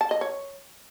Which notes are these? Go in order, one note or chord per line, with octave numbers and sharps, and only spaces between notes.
A5
D#5
C#5